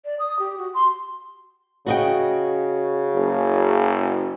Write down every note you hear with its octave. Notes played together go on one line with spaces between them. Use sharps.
D5
D#6
G4
F#4
C6
C#3 F#4 D#5 G5
F#1